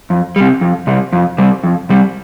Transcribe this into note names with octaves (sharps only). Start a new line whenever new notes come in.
F2
C3 G3
F2
C3 G3
F2
C3 G3
F2
C3 G3